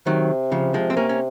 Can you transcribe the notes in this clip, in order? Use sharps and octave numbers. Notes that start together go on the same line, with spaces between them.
C3 D#3 F#3
C#3 F3
F3 G#3
C4
A#3 C#4
C#4